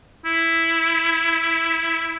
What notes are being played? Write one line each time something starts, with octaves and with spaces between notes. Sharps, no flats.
E4